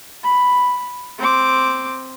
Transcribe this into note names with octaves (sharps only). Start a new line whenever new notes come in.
B5
C4 D6